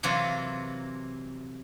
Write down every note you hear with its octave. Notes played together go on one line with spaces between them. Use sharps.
C3 E3 F#3 A#3 F4